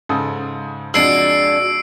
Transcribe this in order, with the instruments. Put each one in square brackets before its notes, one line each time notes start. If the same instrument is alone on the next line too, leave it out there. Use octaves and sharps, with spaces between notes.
[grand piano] G#2 C#3 A4
[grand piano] F2 [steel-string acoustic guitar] G#3 D4 F#4 [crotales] E6 C7 D7